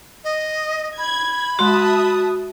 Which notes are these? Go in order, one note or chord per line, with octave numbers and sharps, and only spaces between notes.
D#5
B5 G#6
G#3 F#4 E5 A5 C6 D#6